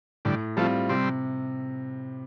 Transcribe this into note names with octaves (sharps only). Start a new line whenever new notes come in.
A2 D3 G3
F3 G3 A3 C4 F4
C3 G3 C4